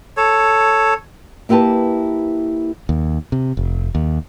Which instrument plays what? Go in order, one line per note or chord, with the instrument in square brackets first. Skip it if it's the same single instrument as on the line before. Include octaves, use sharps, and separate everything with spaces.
[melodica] A4 C#5
[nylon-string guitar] A#3 E4 G4 B4 A5
[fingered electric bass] D#2
C3
F1
D#2